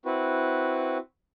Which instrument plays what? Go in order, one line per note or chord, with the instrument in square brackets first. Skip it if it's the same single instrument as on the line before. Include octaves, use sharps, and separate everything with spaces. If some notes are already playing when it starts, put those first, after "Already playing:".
[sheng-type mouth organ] C4 E4 F#4 B4